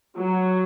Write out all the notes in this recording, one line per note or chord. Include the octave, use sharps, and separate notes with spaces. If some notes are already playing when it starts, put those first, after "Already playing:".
F#3